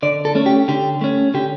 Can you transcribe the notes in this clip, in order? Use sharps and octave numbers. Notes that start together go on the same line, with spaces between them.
D3 D5
A4
A3 C#4
G4
D3 G4
A3 C#4
D3 G4